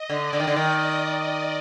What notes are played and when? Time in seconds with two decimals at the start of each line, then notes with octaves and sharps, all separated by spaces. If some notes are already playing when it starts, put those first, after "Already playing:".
Already playing: D#5
0.10 D3
0.25 D5
0.33 D3
0.40 D#3
0.47 D3
0.56 D#3 D5